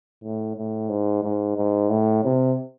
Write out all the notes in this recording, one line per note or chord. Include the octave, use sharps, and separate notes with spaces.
A2
A2
G#2
G#2
G#2
A2
C3